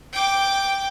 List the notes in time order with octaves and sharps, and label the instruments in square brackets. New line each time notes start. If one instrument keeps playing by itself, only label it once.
[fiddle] G5 D6